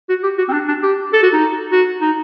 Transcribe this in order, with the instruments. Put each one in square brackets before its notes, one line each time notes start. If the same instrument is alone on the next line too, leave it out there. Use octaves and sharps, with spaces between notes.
[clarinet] F#4
G4
F#4
C4
D4
D4
G4
A4
F#4
D#4
F#4
D#4